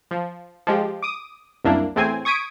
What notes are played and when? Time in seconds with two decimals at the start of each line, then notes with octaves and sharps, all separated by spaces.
0.11 F3
0.67 F3 G#3 G4
1.02 D6 D#6
1.64 C2 F#2 A#3 D4 E4
1.96 E2 A2 C4 G#5
2.25 C#6 D#6 G#6 B6 D7